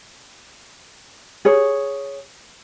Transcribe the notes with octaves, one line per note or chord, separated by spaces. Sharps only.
G#4 C#5